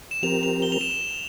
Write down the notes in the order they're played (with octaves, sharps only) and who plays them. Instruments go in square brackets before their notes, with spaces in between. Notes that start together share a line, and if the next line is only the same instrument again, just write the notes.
[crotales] E7
[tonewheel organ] F3 C4 G4 A#4 [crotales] F7
[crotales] F7
G7
F7
E7
E7